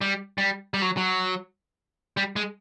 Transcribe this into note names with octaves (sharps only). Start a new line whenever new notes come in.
G3
G3
G3
F#3
F#3
G3
G#3